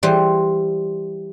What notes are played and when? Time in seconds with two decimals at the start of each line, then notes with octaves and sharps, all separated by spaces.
0.03 E3 G3 C5